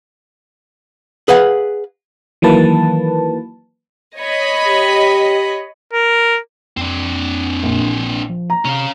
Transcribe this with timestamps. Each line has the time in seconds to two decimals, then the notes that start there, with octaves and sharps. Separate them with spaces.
1.28 G#4 B4 F5 F#5
2.42 D#3 E3 F#3 A#3 B4 A5
4.18 C#5 D#5 B5
4.67 G4
5.93 A#4
6.77 F2 C4 D4
7.63 A#1
8.29 F3
8.50 A#5
8.65 C3 C#4 F5